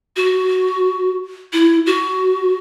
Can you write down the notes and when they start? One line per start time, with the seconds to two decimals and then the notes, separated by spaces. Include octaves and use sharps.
0.16 F#4
1.53 E4
1.86 F#4